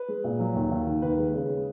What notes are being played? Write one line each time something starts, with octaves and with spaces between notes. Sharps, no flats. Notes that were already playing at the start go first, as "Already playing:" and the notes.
Already playing: B4
G#3
A#2
F#3
D#2
D#2
D#3
D#2 B4
G#3
C#3
G#3